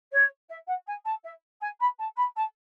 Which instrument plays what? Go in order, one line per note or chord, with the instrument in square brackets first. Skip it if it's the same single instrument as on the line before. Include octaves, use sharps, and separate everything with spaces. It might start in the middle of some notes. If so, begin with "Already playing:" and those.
[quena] C#5
E5
F#5
G#5
A5
E5
G#5
B5
A5
B5
A5